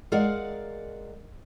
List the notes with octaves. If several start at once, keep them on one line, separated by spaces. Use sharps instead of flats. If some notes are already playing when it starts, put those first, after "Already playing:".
G#3 A#4 D5 F5 F#5